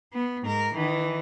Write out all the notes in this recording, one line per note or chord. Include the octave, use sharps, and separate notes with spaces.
B3
G#2 A#4
D#3 E3